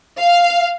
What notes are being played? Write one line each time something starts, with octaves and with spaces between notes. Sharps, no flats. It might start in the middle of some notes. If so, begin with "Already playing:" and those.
F5